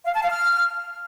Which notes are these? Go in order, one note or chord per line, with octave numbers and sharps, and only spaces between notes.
F5
A5
F5
F6